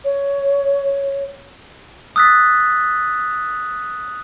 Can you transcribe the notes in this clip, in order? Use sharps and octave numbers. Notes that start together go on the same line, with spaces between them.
C#5
D#6 E6 F#6 A6 B6